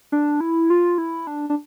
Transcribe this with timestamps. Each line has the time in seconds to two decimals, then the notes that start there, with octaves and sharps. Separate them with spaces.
0.12 D4
0.41 E4
0.70 F4
0.98 E4
1.27 D4
1.50 D4